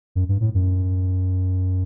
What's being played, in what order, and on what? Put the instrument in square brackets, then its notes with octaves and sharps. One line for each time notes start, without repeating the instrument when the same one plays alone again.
[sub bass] F#2
G2
A2
F#2